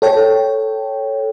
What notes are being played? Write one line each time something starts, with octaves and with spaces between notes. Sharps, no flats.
A4 C#5 G5